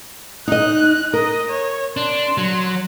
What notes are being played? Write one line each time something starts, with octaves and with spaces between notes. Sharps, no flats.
D#4 D#5 F#6
A#4 D#5
C#5
D4 C6
F#3